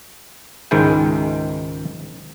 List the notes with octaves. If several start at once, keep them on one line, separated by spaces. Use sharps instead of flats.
C#2 G#2 D#3 G#3 E4 G5